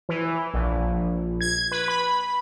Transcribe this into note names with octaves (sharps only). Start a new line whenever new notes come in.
E3
A#1
G#6
B4
B5